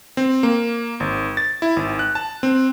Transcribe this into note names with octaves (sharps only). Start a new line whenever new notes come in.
C4
A#3
G#1
A6
E4
G#1
F#6
A5
C4